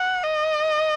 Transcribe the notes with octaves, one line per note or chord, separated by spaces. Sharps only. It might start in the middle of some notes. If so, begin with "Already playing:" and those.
Already playing: F#5
D#5